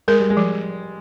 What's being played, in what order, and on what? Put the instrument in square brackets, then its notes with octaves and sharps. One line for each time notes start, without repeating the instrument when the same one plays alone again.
[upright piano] G#3 [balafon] A#4
[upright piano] G3
G#3
[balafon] F3